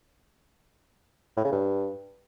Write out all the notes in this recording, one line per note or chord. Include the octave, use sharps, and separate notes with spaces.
A2
C#3
G2